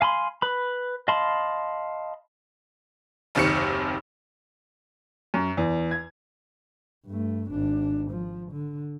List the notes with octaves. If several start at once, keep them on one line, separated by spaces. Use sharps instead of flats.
F5 G#5 B5 C6
B4 B5
D#5 F5 A5 B5 C6
F#1 D#2 C3 D#3 C#6 C#7
F#2
E2
G#6
G2 A3
G#1 D4
F3
D3